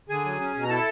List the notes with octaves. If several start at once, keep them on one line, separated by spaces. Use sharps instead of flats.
D3 G#4 G#5
F#3
C#4
B2
A#5
E4 A4 A5